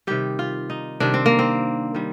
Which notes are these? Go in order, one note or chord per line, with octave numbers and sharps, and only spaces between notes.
C3 D#3 G3 G4
F4
D#4
C3 D#3 G3 D4
C4
A#3
C4
D#3 G3